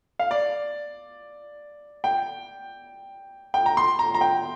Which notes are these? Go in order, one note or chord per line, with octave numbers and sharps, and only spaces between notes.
F5
D5
G5
G5
A#5
C6
A#5
A#5
G5